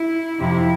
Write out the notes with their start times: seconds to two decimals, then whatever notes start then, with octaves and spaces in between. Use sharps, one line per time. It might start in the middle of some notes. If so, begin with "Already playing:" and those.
Already playing: E4
0.38 F2 C3 F3 E4